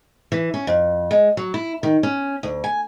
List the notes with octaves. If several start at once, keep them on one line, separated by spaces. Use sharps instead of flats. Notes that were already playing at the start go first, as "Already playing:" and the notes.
E3
C#4
F2
G#3
F#3
E4
D#3
C#4
D2
G#5